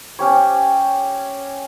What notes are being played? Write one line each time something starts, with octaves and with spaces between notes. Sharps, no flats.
C#4 G4 C#5